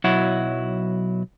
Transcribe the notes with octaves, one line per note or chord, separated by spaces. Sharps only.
B1 F#3 E4 F#4